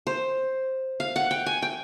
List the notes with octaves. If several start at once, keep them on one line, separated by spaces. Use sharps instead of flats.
C5
F5
F#5
G5
G#5
G5